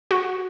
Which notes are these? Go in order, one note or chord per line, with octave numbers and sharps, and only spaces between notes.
F#4